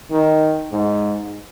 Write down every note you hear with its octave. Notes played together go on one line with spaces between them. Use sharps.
D#3
G#2